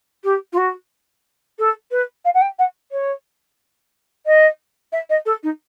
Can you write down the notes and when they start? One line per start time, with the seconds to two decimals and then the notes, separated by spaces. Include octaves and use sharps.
0.24 G4
0.53 F4
0.57 F#4
1.59 A4
1.91 B4
2.25 F5
2.34 F#5
2.41 G5
2.59 F#5
2.92 C#5
4.26 D#5
4.92 E5
5.10 D#5
5.26 A4
5.43 D#4